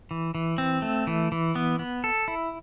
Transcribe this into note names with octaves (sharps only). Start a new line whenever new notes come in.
E3
E3
C4
A3
E3
E3
B3
B3
A4
E4